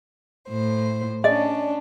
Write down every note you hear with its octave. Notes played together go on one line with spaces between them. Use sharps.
A2 C5
C#4 D4 D5 D#5